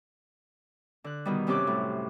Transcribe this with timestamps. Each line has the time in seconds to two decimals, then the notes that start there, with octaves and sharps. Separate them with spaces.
1.04 D3 F#6
1.25 B2 D#3 G3
1.47 F#2 C3 C#4 G4 D6 F#6
1.67 A2